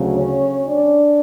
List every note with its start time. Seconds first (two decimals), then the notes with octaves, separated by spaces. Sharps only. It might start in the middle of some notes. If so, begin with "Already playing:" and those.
Already playing: D2 C#3 F#3
0.16 C#4 C#5
0.66 D4 D5